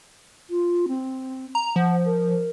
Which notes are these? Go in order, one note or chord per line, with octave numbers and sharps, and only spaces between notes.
F4
C4
A#5
F3 F#5
A#4